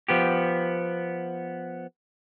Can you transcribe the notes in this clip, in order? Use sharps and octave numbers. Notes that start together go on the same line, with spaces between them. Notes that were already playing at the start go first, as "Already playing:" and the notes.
F3 B3 G4